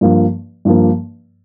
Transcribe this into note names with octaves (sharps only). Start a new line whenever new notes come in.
G2 F3 A#3
G2 F3 A#3